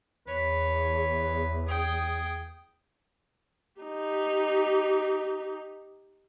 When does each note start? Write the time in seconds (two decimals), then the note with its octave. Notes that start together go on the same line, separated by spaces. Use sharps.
0.28 E2 B4 C#5
1.68 G#4 G5 D#6
3.81 D#4 G4